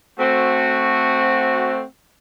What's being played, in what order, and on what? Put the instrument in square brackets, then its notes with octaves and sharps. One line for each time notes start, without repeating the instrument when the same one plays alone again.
[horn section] A3 C4 F#4